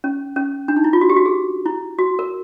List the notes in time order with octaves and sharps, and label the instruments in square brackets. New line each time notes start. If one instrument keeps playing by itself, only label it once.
[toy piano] C#4
C#4
D4
D#4
E4
F4
F#4
G4
F#4
G#4
E4
F#4
A#4